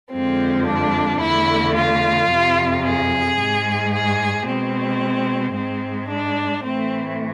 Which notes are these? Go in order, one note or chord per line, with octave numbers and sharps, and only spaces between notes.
F2 D3 F3 G#3 C4
D4
E2 D3 A3 E4
F4
F2 C3 F3
G#4
G#2 G#3
G#4
B2 G#3 C4
G#2 G#3 C4
D4
A2 E3 A3 C4